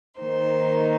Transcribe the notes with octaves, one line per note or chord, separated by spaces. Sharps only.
D#3 A#3 D#4 C5